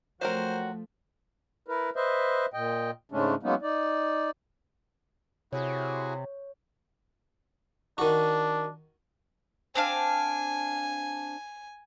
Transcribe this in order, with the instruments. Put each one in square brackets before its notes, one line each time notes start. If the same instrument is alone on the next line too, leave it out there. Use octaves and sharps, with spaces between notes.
[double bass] F3 A3 [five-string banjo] F#3 C4 A#4 [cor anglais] F#4 [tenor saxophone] C5
[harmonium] E4 A#4 B4
B4 C5 D#5 E5
A#2 D#5 G5
G#2 C#3 G#3 A3 C#4 D4
F#3 G#3 A#3 B3 C#4 D#4
D#4 D5
[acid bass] C3 [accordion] E4 F#4 G#4 [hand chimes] C#5
[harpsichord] D#3 F#4 [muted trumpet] D4
[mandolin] C4 D4 F5 [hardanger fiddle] G#5